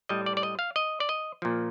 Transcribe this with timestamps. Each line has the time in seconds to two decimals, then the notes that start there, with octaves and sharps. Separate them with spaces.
0.09 A2 G3 D#5
0.26 D5
0.37 D5
0.43 D#5
0.59 F5
0.76 D#5
1.00 D5
1.09 D#5
1.42 A#2 F3